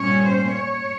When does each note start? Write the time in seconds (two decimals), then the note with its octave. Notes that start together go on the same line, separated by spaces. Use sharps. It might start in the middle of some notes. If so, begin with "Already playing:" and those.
Already playing: A#2 G3 C#4 C#5
0.26 C5
0.59 C#5